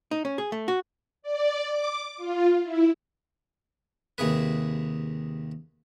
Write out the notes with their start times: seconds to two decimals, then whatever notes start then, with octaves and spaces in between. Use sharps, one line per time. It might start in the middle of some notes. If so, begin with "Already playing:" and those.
0.11 D#4
0.25 C#4
0.38 G#4
0.52 A3
0.68 F#4
1.22 D5
1.65 D6
2.17 F4
2.63 E4
4.18 D#2 C3 G#4 B4